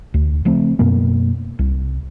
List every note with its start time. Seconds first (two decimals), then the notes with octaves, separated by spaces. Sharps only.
0.14 D2
0.45 C#3 F3 A3 C4
0.79 F#2 B2 A#3
1.59 C2